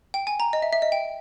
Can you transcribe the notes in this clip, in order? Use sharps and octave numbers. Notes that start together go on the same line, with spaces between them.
G5
G#5
A#5
D#5
E5
E5
D#5
G5